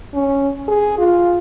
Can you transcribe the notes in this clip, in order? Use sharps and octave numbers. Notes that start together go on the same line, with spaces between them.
C#4
G#4
F4